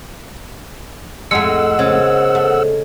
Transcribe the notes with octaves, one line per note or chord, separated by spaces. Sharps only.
F2 A2 G#3 A3 F#5 E6
C#3 B3 A#4 C5
A3